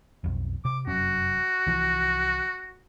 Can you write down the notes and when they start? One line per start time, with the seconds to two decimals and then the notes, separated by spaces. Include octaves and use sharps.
0.24 B1 F2
0.65 C3 D6
0.87 F1 F#2 C#4 F#4
1.67 C2 E3 F3